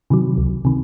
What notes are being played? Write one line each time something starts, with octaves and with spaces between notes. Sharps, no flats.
C3 D#3 F#3
C#2
C3 D#3